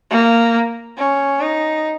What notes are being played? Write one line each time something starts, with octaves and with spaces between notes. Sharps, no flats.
A#3
C#4
D#4